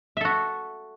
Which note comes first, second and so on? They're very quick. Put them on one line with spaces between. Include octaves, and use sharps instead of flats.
E5 A4 F#4